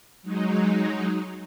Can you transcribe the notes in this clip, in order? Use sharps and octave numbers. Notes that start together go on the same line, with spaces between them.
F#3 G#3 D#4